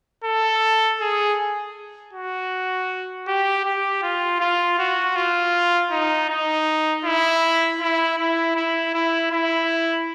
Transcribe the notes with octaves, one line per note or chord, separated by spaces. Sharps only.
A4
G#4
F#4
G4
G4
F4
F4
F#4
F4
D#4
D#4
E4
E4
E4
E4
E4
E4